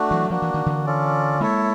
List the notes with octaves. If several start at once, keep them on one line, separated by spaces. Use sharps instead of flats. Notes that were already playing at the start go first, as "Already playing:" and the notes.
Already playing: A3 D4 F#4
E3 F#3
F3 A#3 D4 F#4
E3
D#3
D3 E3
C#4 F4 A4 D5
G#3 A#3 E4 A4 C#5 E5